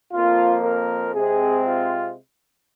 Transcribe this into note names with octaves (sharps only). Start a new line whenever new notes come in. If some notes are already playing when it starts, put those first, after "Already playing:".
F2 F3 A#3 F4
A#4
C3 G#3 C4 G#4
F4